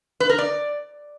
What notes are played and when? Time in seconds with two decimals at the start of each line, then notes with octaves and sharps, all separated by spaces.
0.20 B4
0.29 A#4
0.39 D5